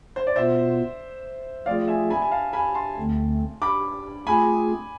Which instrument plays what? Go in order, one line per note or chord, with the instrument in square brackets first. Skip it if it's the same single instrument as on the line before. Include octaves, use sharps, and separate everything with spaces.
[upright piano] C5
D5
[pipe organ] B2 B3 F4 [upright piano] C5 E5
[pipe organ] F3 A3 C4 F4 G#4 [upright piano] D5 F5
[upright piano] E5 G#5
G#5 B5
G#5
F5 A5
G#5 B5
A5 C6
[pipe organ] D2 D3 A3 C4
[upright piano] B5 D6
[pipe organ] A3 C4 F4 G#4 [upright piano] G#5 B5